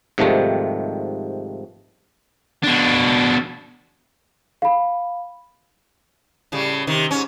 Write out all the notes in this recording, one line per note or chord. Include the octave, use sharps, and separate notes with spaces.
G#2 C3 D#3 F3 G3 A3
B2 D4
F5 B5
A2 C#3 G3
C3 D#3
G#2 C#4